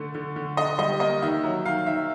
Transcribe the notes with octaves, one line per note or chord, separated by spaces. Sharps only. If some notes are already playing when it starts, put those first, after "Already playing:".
Already playing: D3 A3
D3
D3
D3 D#5
G3 D#5
A#3 D#5
D#3 E5
F#3
D#3 F5
D#3 E5